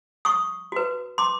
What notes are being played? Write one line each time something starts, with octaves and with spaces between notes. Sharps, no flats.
C#6 D#6
F#4 B4
C6 D6